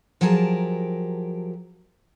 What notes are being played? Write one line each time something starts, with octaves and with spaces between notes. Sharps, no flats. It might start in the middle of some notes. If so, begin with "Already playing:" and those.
F3 F#3 G4 G#4 A#4 A5